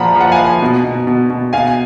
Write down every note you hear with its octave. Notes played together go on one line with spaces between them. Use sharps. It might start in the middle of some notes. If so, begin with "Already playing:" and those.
Already playing: A#2 F3 F#5 A#5 B5
F3 F#5
F5 G#5
F3
B2
B2
B2
B2
B2 F5 G#5